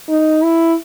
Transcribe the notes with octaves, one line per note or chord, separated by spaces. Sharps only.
D#4
E4